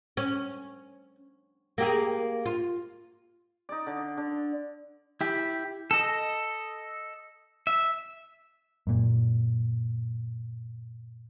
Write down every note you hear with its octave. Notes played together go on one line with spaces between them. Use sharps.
C#4
A#3 G4 G#4
F4
D#4 D5
D3
D3
E4 G4
A4 D#5
E5
F#2 A#2